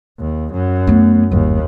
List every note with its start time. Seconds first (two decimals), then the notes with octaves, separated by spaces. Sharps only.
0.19 D#2
0.53 F#2
0.87 A3 B3
1.32 G1 D#2